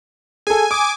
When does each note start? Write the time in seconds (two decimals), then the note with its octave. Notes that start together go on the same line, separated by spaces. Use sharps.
0.47 G#4 A4 G#5
0.71 G#5 D6 D#6